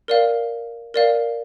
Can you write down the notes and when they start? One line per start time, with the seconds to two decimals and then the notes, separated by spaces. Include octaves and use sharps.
0.08 A#4 D5 F5
0.94 A#4 D5 F5